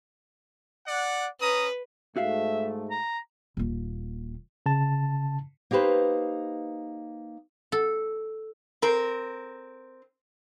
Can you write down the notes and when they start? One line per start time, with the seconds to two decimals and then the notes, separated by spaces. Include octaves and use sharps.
0.87 D5 F#5
1.41 C#4 B4 A#5 D#6
2.16 G#2 A3 F#4 E5 F5
2.91 A#5
3.57 D#1 A#3
4.66 C#3 A5
5.71 A#3 D#4 G4 B4 C5
7.72 A4
8.82 C4 A#4